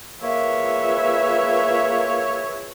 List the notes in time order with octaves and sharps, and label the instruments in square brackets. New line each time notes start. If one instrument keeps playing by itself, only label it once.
[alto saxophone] A#3 [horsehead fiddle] F4 G#4 [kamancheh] B4 E5 [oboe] C#5